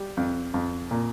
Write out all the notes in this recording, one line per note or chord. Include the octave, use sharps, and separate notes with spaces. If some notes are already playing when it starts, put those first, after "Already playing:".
Already playing: G3
F2
F2
A#2